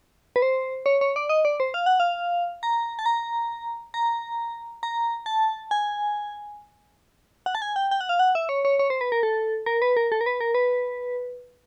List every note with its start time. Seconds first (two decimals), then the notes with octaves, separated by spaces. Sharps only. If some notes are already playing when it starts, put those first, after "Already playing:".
0.36 B4
0.42 C5
0.86 C#5
1.01 C#5
1.16 D5
1.29 D#5
1.45 D5
1.60 C5
1.74 F5
1.86 F#5
2.00 F5
2.63 A#5
2.99 A5
3.06 A#5
3.94 A#5
4.83 A#5
5.26 A5
5.71 G#5
7.46 F#5
7.55 A5
7.62 G#5
7.76 G5
7.91 G5
8.01 F#5
8.09 F5
8.19 F#5
8.35 E5
8.49 C#5
8.65 C#5
8.79 C#5
8.90 C5
9.01 B4
9.12 A#4
9.23 A4
9.66 A#4
9.82 B4
9.97 A#4
10.12 A4
10.21 A#4
10.26 B4
10.41 A#4
10.55 B4